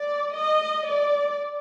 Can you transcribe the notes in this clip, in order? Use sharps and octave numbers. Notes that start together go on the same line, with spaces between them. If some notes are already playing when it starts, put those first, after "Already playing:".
Already playing: D5
D#5
D5